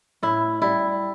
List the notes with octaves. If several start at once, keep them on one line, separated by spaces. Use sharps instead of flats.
A2 E4
G3 E4